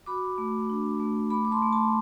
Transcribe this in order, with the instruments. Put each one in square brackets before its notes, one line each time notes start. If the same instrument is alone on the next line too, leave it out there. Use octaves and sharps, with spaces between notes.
[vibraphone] F#4 B5 D6
A3
D4
A3
A3 B5 D6
D6
A5 C6
A3
A5 C6